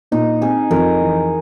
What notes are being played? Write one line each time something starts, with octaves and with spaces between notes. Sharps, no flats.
A#2 D#4
C4 G#4
F2 A#4
E3